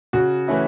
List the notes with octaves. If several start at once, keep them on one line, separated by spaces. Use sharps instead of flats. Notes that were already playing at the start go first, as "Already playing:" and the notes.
C#3 F#4
E3 A3 C#4 E4